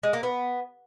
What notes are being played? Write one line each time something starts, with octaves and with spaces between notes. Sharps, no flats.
G#3
A#3
B3